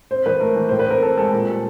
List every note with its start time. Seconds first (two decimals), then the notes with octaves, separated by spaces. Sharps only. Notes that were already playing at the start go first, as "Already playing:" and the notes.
0.11 C4 C5
0.26 E3 B4
0.40 A3 A#4
0.56 E3
0.69 A2 C5
0.79 B4
0.87 C4 A#4
1.02 C4 A4
1.17 G#3 A4
1.33 A#2
1.48 G3